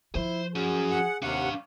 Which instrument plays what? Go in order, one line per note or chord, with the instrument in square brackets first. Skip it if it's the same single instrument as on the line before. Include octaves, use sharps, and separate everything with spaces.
[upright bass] F3 [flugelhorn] E4 [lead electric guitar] C5
[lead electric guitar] C#4 F#4 [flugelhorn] G#4
[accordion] F#5
[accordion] D#2 C3 F#5 [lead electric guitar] D4 F5